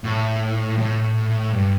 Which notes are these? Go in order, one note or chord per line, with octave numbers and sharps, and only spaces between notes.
A2
A2
G2